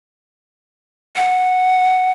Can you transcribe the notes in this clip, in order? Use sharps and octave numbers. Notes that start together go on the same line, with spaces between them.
F#5